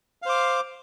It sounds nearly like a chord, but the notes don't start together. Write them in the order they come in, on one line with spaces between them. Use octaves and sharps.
F5 C5 D6